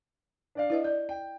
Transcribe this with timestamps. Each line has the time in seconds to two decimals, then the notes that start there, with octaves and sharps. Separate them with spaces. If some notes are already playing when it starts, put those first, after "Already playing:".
0.55 D4 D5 F5
0.70 E4 B4 D#5
0.84 D5 G6
1.09 G5